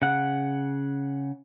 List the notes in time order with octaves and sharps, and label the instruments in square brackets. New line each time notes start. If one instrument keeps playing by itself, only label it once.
[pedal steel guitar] C#3 F#5